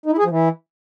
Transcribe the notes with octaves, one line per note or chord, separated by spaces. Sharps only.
D#4
E4
G#4
F3
E3